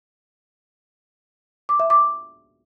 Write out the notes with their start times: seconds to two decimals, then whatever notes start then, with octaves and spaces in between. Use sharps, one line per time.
1.69 D6
1.80 E5
1.90 D6